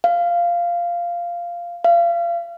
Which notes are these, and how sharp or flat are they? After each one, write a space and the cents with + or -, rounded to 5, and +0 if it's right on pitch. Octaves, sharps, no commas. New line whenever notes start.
F5 -10
F5 -30